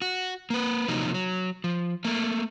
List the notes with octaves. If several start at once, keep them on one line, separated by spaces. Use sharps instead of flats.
F#4
A#3 B4
C3 F3 F#3 A#3 D#4
F#3
F3
A3 A#3